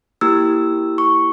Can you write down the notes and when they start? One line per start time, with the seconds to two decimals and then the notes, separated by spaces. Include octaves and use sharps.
0.21 A#3 E4 G4 E6
0.98 C#6